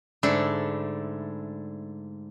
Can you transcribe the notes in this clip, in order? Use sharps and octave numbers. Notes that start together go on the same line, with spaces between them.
G#2 D3 A3 D4 E4